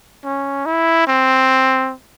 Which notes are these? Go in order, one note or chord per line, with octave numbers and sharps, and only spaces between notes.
C#4
E4
C4